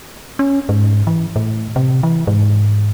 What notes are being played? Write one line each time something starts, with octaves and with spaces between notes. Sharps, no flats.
C#4
G#2
E3
A2
C3
E3
G#2